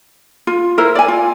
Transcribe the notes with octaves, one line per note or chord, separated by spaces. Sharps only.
F4
E4 A#4 C5
D5 G#5
F4